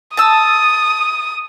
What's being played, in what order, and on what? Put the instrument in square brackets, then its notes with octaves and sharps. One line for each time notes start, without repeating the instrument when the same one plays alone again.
[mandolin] A5 E6 [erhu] D#6